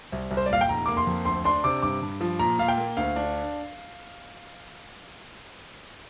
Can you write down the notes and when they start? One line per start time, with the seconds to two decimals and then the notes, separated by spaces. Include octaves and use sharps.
0.12 C2
0.31 C2
0.37 C5
0.46 D5
0.50 A#2 F5
0.61 G5
0.69 F1 A#5
0.86 A#3 D6
0.97 C6
1.07 F2
1.25 D2 C6
1.44 D4 C6
1.64 C3 D6
1.83 G2 D6
2.02 G2
2.21 F3
2.39 A#2 A#5
2.59 A#2 F5
2.68 G5
2.78 A#3
2.97 D2 F5
3.16 D4